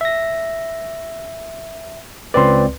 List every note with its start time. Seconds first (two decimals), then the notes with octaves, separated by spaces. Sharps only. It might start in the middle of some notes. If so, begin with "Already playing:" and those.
0.01 E5 A#6
2.34 C#2 C4 B4 D5 C6